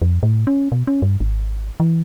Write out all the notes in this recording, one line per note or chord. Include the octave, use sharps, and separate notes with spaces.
F2
A2
C#4
B2
C#4
G2
G#1
E3